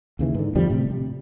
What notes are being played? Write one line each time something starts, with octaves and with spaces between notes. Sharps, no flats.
D#2 C#3 E3
G#2 D3
E2 D3 F3 G3
A2 C3
C3